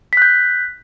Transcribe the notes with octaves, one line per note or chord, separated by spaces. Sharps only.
F#6 G6 B6